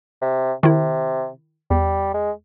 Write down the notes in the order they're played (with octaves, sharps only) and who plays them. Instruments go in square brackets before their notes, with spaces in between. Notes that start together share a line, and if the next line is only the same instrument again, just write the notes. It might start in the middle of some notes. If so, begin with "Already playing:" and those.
[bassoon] C3
[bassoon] C3 [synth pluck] D#3 E4
[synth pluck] E2 [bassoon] G3
[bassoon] G#3